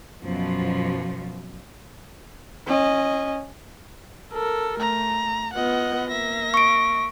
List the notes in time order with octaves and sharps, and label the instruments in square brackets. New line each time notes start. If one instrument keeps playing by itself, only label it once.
[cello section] F#2 B2 F3
[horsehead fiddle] C#4 D#5
[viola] A4 A#4
[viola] A3 [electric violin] A#5
[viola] B3 F4 [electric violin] D#5 F#5
[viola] A#3 [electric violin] E5 A#6
[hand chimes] C#6 D7